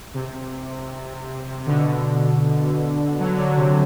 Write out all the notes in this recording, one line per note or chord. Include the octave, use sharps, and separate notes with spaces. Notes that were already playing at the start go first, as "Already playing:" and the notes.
C3
B2 D3
D3 F#3
D3 F#3
C3